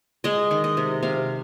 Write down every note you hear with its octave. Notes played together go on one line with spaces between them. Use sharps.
G#3 D#5
D#3
D#5
C3
C3 F5